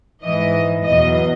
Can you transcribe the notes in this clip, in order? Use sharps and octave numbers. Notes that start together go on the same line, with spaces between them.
G#2 E3 D#5
E2 B2 F#3 D#5